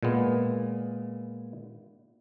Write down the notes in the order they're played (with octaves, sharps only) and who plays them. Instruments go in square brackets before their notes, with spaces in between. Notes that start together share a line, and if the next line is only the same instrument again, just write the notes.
[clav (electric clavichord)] A#2 G#3 B3